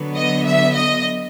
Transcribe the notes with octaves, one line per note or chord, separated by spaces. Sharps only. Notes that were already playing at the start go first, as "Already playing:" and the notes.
Already playing: D3 F#3 B3
D#5
E5
D#5